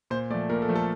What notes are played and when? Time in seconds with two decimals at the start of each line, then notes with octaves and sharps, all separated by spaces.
0.10 A#2 C5
0.30 A3 D5
0.34 F3
0.49 A#2 A#4
0.62 A4
0.68 F3 A3
0.76 A4